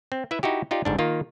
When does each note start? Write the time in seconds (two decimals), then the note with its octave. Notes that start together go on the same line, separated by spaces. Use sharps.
0.12 C4
0.31 E4 B4 E5
0.43 D#4 E4 F#4 G4
0.71 D#4 F4 G4 D5
0.85 G1 G#2 D4
0.99 D#3 A#3 F4